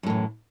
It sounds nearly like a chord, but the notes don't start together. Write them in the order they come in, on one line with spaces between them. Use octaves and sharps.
F#2 A2 E3